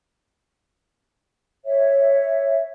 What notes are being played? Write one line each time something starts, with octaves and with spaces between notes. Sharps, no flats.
C#5 E5